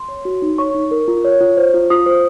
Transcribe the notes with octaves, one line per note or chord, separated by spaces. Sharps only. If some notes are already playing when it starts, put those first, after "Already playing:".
Already playing: C6
C#5
F#4
D#4
C#5 C#6
D#4
A#4
F4
C#5
F4
C5
F4
F4 D#6
C5